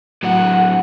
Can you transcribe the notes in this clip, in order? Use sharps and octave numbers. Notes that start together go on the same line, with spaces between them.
A2 F#3 F#5